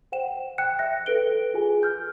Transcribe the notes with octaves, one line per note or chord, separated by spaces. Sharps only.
C5 F#5 G5 E7
G5 F#6 C#7
E5 F#6 A#6
A4 B4 D7 G7
F4 G#4 G#5
F6 G6